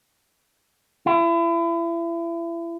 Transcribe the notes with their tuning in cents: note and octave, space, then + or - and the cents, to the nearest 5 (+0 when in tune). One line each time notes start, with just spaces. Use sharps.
E4 +35